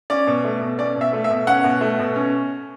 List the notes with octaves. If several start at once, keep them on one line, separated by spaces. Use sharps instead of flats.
C#4 D5
B2
A3
B2
C#4 D5
B2
E5
A3
E5
B2
C#4 F#5
B2
A3
B2
C#4